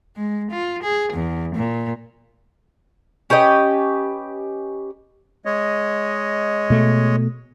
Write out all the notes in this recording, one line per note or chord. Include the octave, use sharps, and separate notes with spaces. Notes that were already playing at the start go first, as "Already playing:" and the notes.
G#3
F4
G#4
E2
A#2
C#4 G4 B4 D#5
G#3 C#5 D#5
B2 A3